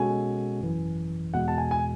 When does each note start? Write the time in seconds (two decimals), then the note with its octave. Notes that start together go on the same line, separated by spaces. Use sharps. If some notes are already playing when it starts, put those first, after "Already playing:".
Already playing: B2 G#3 C#4 F#4 A4 G#5
0.60 G#1 F#2 E3
1.34 E2 B2 G#3 F#5
1.48 A5
1.58 G#5
1.71 G#5